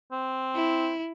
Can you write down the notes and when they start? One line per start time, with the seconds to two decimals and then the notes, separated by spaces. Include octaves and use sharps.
0.12 C4
0.55 E4